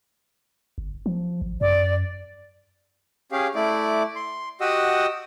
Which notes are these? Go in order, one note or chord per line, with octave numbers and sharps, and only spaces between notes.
G1
F3
G#1
F#2 D5
C#4 G4 G#4 F5
A3 E4 D5 D6
C6
F#4 G4 D#5 F#5 D#6 E6